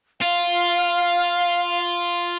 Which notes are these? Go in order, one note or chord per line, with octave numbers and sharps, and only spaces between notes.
F4 F5